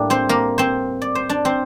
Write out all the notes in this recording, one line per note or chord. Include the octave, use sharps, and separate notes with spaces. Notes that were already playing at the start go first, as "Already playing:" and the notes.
Already playing: A2 G3 A#3 D4
C4 C5
A#3 A#4
C4 C5
D5
C5
D4 D5
C4 C5